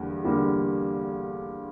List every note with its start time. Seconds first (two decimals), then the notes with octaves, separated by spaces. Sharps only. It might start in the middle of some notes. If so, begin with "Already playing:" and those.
Already playing: E2 D3 G3 A#3
0.25 E2 D3 G3 A#3